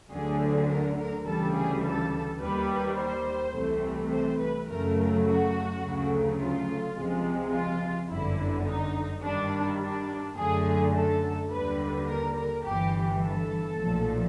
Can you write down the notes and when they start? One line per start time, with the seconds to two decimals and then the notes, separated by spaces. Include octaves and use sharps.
0.11 D2 D3 F#3 A3 G#4
0.69 A#4
0.97 A#4
1.26 D2 C#3 E3 G3 A4
1.54 G#4
1.83 A4
2.40 D#2 D#3 G3 B4
2.96 C5
3.53 C2 C3 E3 A3
4.10 C5
4.39 B4
4.67 F#2 C#3 F#3 A3 A#4
5.24 F#4
5.81 D2 C#3 F#3 A3
6.38 F4
6.95 C#2 C3 F3 G#3
7.52 F4
8.09 G1 F#2 D3 E4
8.66 D#4
9.22 G2 D#3 G3 D4
9.80 D4
10.36 F#2 D3 F#3 A3 G#4
10.94 A4
11.51 D#2 D3 G3 B4
12.07 A#4
12.36 A#4
12.64 G1 G2 E3 G4
13.21 A4
13.78 B1 A#2 F3 A3